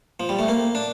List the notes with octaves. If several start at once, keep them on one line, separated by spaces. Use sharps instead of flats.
F3
G3
A3
A#3
D4